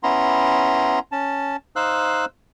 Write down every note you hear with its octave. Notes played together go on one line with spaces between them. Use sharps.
B3 C#4 E4 A#5 C6
C#4 A5
D#4 C5 F5 E6 F#6